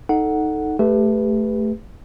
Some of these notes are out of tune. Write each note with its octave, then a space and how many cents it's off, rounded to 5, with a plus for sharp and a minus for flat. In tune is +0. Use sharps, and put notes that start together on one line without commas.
D#4 +0 A4 +0 F#5 +0
A3 +0 G4 +25 B4 +0